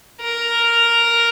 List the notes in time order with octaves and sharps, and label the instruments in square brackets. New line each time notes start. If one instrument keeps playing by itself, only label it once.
[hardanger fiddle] A#4